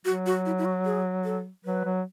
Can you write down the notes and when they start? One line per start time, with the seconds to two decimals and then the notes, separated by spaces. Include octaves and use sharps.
0.05 F#3 F#4
0.26 F#4
0.46 E4
0.58 E4
0.65 F#4
0.85 G#4
1.24 A4
1.65 F#3 B4
1.85 F#3